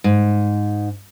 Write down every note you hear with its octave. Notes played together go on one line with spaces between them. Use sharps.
G#2